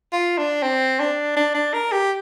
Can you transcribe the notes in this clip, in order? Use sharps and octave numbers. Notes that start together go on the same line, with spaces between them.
F4
D4
C4
D4
D4
D4
A#4
G4